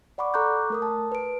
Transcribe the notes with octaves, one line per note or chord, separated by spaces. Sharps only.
D5 F#5 B5 C#6 D6
A4 A#5 C#6 D6 F#6 G6
A3 A#4 D#6
A5
B4 D7